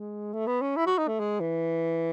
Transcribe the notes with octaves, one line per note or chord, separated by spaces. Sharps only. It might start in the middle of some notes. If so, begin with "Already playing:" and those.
Already playing: G#3
A3
B3
C#4
E4
F#4
D#4
A3
G#3
E3